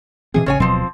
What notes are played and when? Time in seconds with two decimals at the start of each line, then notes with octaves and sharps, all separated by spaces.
0.34 B2 E3 C4 G#4
0.46 A1 C#3 C#5 G#5
0.60 D1 B2 F3 F#3 C4